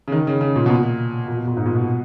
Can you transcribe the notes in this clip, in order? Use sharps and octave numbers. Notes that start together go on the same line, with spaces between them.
C#3
D#3
C#3
C#3
A#2
B2
A#2
A#2
B2
A#2
G#2
A#2
B2